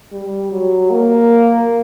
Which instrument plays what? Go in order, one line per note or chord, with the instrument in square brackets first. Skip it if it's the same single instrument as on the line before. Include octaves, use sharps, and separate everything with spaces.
[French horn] G3
F#3
A#3